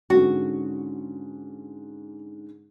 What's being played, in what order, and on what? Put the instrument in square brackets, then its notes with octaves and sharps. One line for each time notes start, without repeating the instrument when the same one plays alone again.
[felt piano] G#2 D3 C#4 [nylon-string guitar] F#4